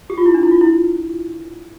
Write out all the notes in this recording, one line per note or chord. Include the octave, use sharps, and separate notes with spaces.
G4
F4
E4
D4
E4
F4
E4